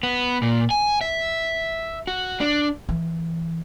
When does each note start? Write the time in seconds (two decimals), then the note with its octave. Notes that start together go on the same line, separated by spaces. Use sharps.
0.03 B3
0.42 A#2
0.70 G#5
1.01 E5
2.07 F#4
2.41 D4
2.89 E3